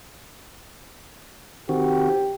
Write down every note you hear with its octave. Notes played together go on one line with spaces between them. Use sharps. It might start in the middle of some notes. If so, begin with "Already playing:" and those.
D#3 C4 F#4 G4